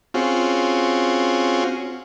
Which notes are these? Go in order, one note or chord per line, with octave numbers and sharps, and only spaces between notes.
C4 C#4 F4 F#4 G#4